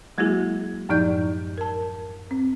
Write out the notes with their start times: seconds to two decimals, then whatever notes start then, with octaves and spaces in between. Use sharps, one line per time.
0.18 F#3 G#3 A#3 E4 F#4 G#4
0.89 F#2 A2 F3 D#4 D5 G6
1.58 A#4 A5
2.31 C4